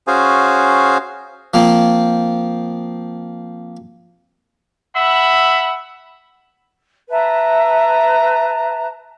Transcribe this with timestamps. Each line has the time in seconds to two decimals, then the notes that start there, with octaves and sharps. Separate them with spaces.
0.07 C#4 F#4 G#4 C5 F5 G#5
1.54 F3 A#3 C4
4.95 E5 F#5 B5
7.09 B4 E5 A5 A#5